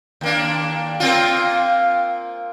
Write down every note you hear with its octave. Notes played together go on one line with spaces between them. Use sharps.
D#2 A#3 D4
A#3 C4 F4